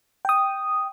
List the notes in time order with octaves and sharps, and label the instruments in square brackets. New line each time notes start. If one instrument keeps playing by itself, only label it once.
[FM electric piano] G5 D#6